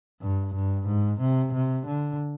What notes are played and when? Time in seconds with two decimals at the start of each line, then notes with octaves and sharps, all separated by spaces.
0.21 G2
0.54 G2
0.87 G#2
1.21 C3
1.53 C3
1.87 D3